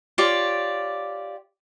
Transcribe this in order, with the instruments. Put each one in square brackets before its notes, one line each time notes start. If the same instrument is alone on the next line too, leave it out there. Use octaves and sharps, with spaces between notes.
[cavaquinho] F4 G4 C#5 D5